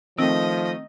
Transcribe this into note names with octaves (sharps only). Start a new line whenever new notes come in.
D#3 F3 A3 C4 D#5